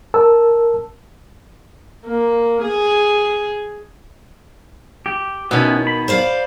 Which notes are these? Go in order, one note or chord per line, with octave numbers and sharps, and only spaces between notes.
A#4 A5 E6
A#3
G#4
G4
B2 D#3 B3 C#4 E4
B5
C5 D5 F5